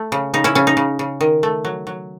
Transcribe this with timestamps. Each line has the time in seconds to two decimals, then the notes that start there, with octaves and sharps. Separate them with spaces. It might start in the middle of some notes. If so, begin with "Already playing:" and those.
Already playing: A3
0.12 C#3
0.34 C#3 D#4
0.44 C#4 E4
0.55 C#3 C#4
0.67 D#4
0.77 C#3
0.99 C#3
1.21 D#3
1.43 A3
1.65 F#3
1.87 F#3